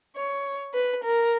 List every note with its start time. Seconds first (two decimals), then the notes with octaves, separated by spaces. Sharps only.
0.16 C#5
0.74 B4
1.04 A#4